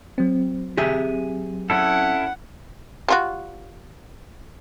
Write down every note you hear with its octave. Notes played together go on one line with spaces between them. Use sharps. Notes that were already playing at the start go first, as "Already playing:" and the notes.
F#3 C4
G4 G#4 E5
C#4 E4 A4 F#5
G3 F4 F#4